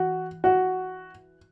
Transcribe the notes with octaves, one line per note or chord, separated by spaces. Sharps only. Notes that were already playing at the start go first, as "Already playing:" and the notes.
Already playing: E3 F#4
F#4